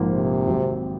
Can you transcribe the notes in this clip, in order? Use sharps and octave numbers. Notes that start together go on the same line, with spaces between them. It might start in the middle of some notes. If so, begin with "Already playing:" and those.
Already playing: A#1 G#2 F3 A#3
C3
G#1 G#2 F#3 C4 F#4